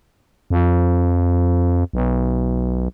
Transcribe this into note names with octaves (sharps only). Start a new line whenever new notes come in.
F2
B1